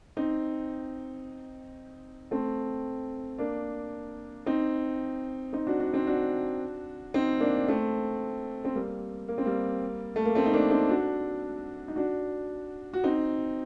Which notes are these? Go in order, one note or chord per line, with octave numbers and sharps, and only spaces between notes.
C4 D#4
A3 C4
A#3 D4
C4 D#4
C4 D#4
D4 F#4
D4 F#4
C4 D#4
D4 F#4
C4 D#4
A#3 D4
A3 C4
C4
G3 A#3
A#3
C4
G3 A#3
A3
A#3
A3 C4
D#4
A#3 D4
C4 D#4
D4 F#4
D#4
D4 F#4
F#4
C4 D#4